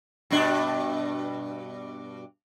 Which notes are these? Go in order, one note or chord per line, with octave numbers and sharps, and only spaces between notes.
G2 B2 D4